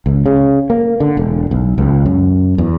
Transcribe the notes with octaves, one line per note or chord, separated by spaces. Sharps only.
C#2
C#3
A#3
D3
E1
B1
C#2
F#2
E2